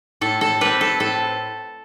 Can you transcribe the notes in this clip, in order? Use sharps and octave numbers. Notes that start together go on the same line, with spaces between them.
A2 A4
A4
G3 C4 B4
A4
A2 A4